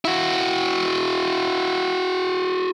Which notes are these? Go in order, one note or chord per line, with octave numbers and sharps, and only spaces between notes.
E4 F#4